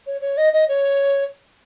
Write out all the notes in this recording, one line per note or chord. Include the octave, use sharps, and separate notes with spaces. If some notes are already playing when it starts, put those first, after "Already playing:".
C#5
C#5
D#5
D#5
C#5